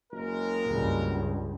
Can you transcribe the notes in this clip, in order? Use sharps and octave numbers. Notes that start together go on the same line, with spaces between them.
F#1 G#3 A#4
C#2 G2